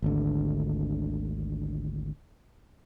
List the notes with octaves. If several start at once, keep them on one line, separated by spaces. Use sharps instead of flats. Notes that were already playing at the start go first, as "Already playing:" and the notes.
G#1 D2 D3